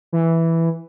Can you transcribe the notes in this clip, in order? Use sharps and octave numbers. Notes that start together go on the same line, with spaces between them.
E3